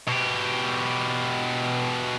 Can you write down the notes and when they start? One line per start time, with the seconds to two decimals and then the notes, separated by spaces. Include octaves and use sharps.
0.08 B2 G4